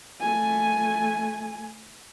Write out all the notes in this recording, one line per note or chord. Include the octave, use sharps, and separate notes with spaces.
A3 G#5